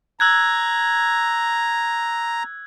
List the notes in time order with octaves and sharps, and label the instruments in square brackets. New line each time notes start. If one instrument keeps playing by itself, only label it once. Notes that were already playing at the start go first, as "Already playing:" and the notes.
[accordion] A#5 [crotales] E6 F#6 G#6